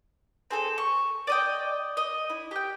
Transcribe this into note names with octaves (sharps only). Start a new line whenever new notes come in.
C4 G#4 A4
C#6
D5 D#5 G5
D#5
E4
G4 G5